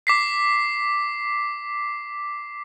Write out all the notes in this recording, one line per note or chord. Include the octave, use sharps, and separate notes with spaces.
D6 B6 C7